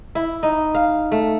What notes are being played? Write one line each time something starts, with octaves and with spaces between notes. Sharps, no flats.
E4
D#4
F5
A3